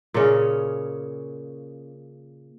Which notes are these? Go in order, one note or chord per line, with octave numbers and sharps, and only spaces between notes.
A#2 C#3 C#4 D#5